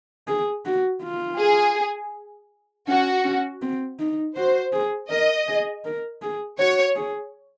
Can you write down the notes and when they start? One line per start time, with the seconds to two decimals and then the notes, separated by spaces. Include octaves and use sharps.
0.28 G#4
0.65 F#4
1.03 F4
1.39 G#4
2.88 C#4 F#4
3.24 C#4
3.62 C4
3.99 D#4
4.36 F#4 C5
4.73 G#4
5.10 A#4 D#5
5.48 G#4
5.85 A#4
6.22 G#4
6.59 F#4 C#5
6.96 G#4